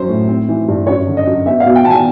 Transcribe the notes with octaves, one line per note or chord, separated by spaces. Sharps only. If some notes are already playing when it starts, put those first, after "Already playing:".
Already playing: F#2 F#3 C#4 C5
A2
C4
E3
G2
F#2 C#5
D3
D#5
F#2
B3 E5
F5
B2
G5
E2 A5
G#5